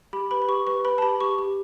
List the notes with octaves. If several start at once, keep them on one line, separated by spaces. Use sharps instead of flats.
G4 B5
B4 B5
B5
G4 C#6
B4 C#6
B4 B5
A5
G4 B5
G4 C#6
G4